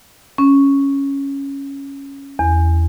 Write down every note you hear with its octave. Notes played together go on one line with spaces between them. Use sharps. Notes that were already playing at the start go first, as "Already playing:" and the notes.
C#4
E2